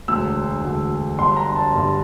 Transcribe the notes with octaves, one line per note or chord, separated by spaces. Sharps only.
E1 D2 D3 E6
E1 D2 D3
G1 G2 D3 G3 C6
A#5
A5
G1 G2 D3 G3